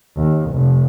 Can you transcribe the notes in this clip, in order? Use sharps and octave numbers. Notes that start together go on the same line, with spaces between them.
D#2
F1